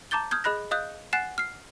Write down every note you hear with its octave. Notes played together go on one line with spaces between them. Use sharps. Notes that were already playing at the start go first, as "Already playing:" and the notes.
A5 A#5 D6 G6 A6 G7
D#6 F6 G6 G#6
G#4 D#5 B5 F#6 A#6
D#5 F5 D#6 F#6 G6
F#5 G#5 F#6 A6 C7 E7
F6 C7